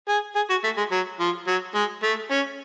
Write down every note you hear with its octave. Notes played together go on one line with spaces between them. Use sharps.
G#4
G#4
F#4
A3
G#3
F#3
F3
F#3
G#3
A3
C#4